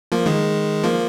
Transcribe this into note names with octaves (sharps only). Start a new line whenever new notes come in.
F3 A#3
D#3 G#3
F3 A#3